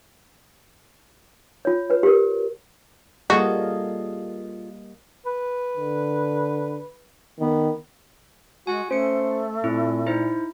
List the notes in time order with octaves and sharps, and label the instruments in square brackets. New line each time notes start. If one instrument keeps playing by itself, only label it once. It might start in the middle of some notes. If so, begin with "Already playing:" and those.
[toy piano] F4 C#5
B4 C#5
G4 A#4
[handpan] G3 A#3 D#5 [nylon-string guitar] F4 G#4 A4 [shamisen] F#4
[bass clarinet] B4
[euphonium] D3
[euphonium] D#3 [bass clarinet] B3
[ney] G#3 [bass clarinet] F#4 [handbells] G#5
[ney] A3 [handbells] C#4 C#7 [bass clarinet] C5
[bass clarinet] A#2 [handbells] C4 E4
[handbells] D#4 E4 C5